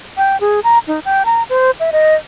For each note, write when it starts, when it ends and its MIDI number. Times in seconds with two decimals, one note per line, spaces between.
0.17 0.39 79
0.41 0.60 68
0.64 0.78 82
0.88 1.00 63
1.05 1.25 79
1.25 1.43 82
1.49 1.71 72
1.80 1.90 76
1.92 2.15 75